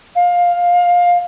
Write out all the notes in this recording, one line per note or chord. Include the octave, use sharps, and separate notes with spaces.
F5